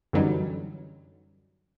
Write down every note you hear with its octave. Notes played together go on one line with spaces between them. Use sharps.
F#2 D3 E3 F#3 G3 D#4